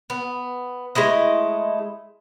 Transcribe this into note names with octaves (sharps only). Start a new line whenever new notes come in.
B3
G#3 A3 E4 D#5